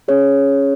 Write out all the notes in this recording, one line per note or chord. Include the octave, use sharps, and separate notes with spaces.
C#4 G#4 C#5